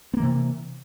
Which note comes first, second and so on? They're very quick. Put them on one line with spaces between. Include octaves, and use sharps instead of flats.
B3 A#3 E3 C3